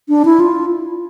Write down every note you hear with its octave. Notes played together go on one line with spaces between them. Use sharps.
D4
E4
F4